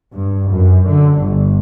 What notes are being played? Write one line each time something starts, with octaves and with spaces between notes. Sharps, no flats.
G2
F#2
D3
G1